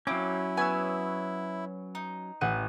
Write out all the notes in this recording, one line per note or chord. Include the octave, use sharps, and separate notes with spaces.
F#3 A#3 C4 C#4 E4 D6
B3 B4 C#5 G#5 E6
D#4
A1 F#5 D#7